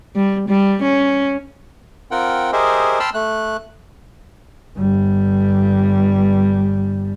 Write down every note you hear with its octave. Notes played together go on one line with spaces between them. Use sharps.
G3
G3
C#4
C4 F4 A#4 F#5 G5
G4 G#4 A#4 C5 D#5 E5
G5 A5 B5 C6 E6 F6
A3 F#6
G1 G3